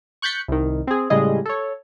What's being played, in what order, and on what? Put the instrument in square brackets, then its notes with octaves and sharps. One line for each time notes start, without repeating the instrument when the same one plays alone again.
[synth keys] C#6 F#6 G6 A6 B6 C#7
C2 D#3
C4 G#4
A2 C#3 G3 G#3 G#4 D#5
A4 C#5